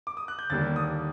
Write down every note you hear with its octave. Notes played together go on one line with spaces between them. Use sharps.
D6
D#6
F#6
G6
D#2 D3 G3 A#3 A6
D#6